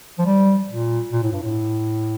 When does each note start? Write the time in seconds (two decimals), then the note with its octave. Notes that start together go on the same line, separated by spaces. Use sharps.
0.19 F3
0.26 G3
0.69 A#2
1.13 A#2
1.23 A2
1.33 G2
1.42 A2